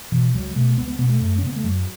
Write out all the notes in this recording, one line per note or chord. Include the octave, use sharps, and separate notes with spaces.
B2 E3
C#2 F#3
B2 A3
C#2 B3
B3
B2 B3
A3
F#2
C#4
C#3 B3
A3
F#2 F#3